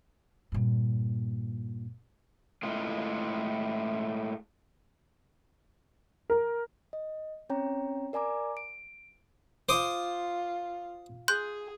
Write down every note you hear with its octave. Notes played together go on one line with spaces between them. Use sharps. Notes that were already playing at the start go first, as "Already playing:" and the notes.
G2 A#2
A2 G#3 F4
A#4
D#5
C4 C#4 C#5 G5 A#5
A#4 D5 G#5 A#5 D6
D7
F4 C5 D6 D#6
G#4 C6 F#6 G6